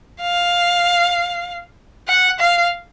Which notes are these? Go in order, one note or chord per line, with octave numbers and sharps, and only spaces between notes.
F5
F#5
F5